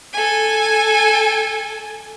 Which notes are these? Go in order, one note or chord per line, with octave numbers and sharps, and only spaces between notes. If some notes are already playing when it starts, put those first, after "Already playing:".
A4 G#5